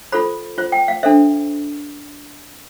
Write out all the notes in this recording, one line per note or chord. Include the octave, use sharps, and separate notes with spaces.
F4 A4 C5 B5
F4 C5
G5
F5
D4 A4 C5 E5